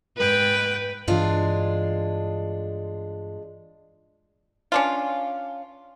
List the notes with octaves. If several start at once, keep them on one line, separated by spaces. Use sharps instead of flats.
G#2 B4 G5
G2 E3 G#3 D4 F4
C#4 D4 F4